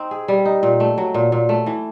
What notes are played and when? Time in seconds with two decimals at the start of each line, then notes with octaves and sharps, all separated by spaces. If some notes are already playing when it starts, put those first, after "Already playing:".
Already playing: C4 D#4
0.11 G#4
0.28 G3
0.45 D#4
0.63 A#2
0.80 A3
0.98 F#3
1.14 A#2
1.32 A#2
1.49 A3
1.66 E3